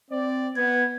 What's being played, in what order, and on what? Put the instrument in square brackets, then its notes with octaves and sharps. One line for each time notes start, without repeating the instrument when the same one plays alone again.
[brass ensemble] C4 D5
[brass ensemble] B3 [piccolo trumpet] G#6